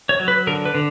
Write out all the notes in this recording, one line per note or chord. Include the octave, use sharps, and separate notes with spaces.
C#5
F#3
B4
D3 A#4
B4
D3